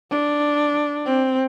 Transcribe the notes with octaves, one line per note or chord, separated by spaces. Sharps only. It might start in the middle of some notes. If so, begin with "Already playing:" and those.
D4
C4